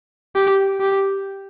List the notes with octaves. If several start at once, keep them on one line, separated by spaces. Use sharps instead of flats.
G4
G4